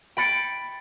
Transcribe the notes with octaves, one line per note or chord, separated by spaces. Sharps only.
G5 B5 A6 C#7 D7